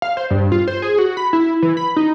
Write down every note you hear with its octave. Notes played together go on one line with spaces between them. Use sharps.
F5
C5
G2
F4
C5
G#4
F#4
B5
E4
E3
B5
D#4